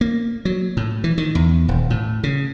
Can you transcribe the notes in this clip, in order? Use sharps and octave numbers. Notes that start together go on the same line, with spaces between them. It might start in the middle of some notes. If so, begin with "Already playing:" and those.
A#3
F#3
A2
E3
D#3
E2
D#1
A2
C#3